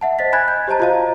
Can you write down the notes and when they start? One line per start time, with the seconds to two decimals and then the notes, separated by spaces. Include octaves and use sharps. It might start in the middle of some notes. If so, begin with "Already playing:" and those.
0.01 E5 F#5 A5
0.19 C5 D#5 A6 B6
0.32 G#5 B5 F#6 G#6 A6
0.48 G6
0.68 G4 C5 D#5 A5 A#5
0.80 F4 F#4 C5 D#5 F5 A#5